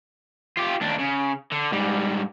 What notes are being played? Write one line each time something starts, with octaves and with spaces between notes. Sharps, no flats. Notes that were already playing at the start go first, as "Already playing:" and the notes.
F4 G4
D#2 D4
C#3
D3
G#2 G3